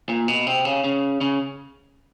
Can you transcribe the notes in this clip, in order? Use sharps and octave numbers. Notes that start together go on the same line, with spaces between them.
A#2
B2
C3
C#3
C#3
C#3